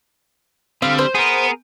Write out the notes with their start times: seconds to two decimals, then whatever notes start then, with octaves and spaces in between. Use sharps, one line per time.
0.82 D3 G3 C4 F5
0.99 C5
1.15 B3 G#4 A#4